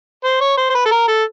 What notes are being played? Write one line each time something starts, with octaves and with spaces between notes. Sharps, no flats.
C5
C#5
C5
C5
B4
A4
A#4
A4